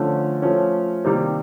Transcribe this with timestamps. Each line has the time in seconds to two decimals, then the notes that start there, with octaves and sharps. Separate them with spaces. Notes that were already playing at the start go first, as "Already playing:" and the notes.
Already playing: D3 F3 A3 C#4
0.42 F3 A3 C#4
1.05 C3 D#3 G3 A#3